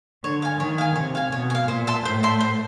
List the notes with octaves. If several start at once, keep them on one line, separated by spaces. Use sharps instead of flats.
D3 C#5
F5 G#5
D#3 C#5
F5 G#5
C3 C#5
F5 G#5
B2 C#5
G#5
F5
A#2 C5
E5 A5 C6
A2 C5
E5 A5 C6
C5